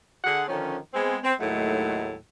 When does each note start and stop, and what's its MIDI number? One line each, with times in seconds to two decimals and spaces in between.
0.24 0.45 50
0.24 0.45 68
0.24 0.45 78
0.48 0.77 50
0.48 0.77 51
0.48 0.77 53
0.48 0.77 61
0.94 1.17 56
0.94 1.17 59
0.94 1.17 60
1.24 1.34 60
1.40 2.15 39
1.40 2.15 45
1.40 2.15 54
1.40 2.15 56
1.40 2.15 57
1.40 2.15 63